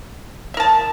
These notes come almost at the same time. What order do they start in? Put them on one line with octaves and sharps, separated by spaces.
E5 A#4 A5